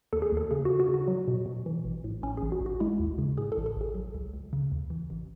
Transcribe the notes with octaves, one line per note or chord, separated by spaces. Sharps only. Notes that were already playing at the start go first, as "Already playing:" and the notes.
D#2 A4
G#4
D#2
A4
C#3 G#4
C#3 F#4
F#4
C#3
F#4
F#3
B2
B2
E3
A1
A2
A1 C#4
A1 G#4
F#4
A1
F#4
G#3 E4
D#2
C#3
A2 G#4
A4
A1
A4
A1 G#4
F#3
C#2
C#2
C#3
D#2
E3
A1